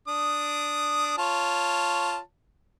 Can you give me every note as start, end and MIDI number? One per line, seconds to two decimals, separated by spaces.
0.08 1.14 62
0.08 1.14 87
1.18 2.19 65
1.18 2.19 73
1.18 2.19 81